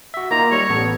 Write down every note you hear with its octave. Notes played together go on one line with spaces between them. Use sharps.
F#4 E5
A#3 D#4 F4 A#5
G3 C#5
A1 B3 A4